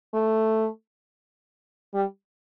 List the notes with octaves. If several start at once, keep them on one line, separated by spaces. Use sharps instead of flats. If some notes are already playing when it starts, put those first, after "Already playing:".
A3
G3